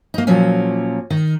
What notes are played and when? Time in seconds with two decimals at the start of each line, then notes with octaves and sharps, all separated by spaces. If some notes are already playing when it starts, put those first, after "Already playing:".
0.14 A#3 D#4
0.27 A#2 F3 F#3 A#3 C#4
1.10 D#3